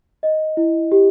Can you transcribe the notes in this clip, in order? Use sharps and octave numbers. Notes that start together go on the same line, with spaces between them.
D#5
E4
G4